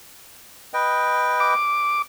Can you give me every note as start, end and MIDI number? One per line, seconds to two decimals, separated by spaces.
0.74 1.54 71
0.74 1.54 75
0.74 1.54 79
1.40 2.02 86